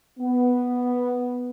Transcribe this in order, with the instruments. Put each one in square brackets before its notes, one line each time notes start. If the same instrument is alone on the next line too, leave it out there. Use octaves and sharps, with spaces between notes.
[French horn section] B3